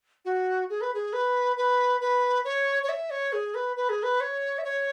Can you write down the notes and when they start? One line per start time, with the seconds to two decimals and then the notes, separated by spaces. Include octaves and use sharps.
0.25 F#4
0.70 G#4
0.81 B4
0.94 G#4
1.13 B4
1.57 B4
2.01 B4
2.45 C#5
2.83 C#5
2.89 E5
3.10 C#5
3.33 G#4
3.55 B4
3.76 B4
3.89 G#4
4.03 B4
4.21 C#5
4.58 E5
4.64 C#5